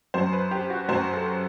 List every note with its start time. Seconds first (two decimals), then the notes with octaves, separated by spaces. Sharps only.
0.14 F#2 F#3 C5
0.33 B4
0.51 G4
0.70 F#4
0.89 F#2 F#3 C5
1.13 A4